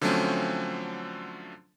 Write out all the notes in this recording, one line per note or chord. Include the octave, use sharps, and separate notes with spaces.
D3 F3 F#3 A3 C4 C#4